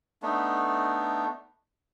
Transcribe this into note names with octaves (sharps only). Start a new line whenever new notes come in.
A3 B3 D4 D#4